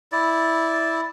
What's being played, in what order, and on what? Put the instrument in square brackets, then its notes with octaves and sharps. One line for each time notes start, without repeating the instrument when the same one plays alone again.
[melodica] E4 D5